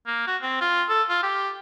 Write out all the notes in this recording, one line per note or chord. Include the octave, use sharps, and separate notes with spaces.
A#3
F#4
C4
F4
A4
F4
G4